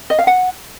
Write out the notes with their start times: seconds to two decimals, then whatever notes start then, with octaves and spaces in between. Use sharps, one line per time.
0.10 D#5
0.19 F5
0.27 F#5